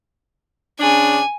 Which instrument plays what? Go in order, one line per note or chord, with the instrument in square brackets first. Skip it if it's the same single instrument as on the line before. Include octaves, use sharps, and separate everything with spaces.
[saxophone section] C#3 D4 [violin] G#5